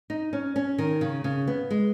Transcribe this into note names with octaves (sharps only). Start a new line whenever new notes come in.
D#4
C#4
C#4
D#3
C#3
C#3
B3
G#3